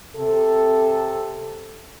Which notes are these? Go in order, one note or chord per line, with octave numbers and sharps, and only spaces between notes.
C3 A4